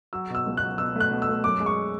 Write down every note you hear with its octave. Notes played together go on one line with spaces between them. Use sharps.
F#3 E6
B2 E6
C#2
F#6
F#3
B2 E6
A3 F#6
B2
E6
A3
F#2 D6
G#3
C#6